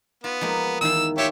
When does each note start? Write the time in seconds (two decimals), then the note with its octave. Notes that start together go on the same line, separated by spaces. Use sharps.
0.24 B3 F4
0.41 F3 G#3 A#3
0.81 E2 D#3 F5 E6
1.18 F4 G4 C#5 E5